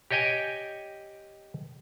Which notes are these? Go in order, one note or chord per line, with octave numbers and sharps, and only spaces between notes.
G4 C#5 D#5 G5 G#5